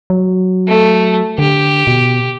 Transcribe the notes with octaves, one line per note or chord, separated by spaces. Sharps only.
F#3
A3
D3 G4
B2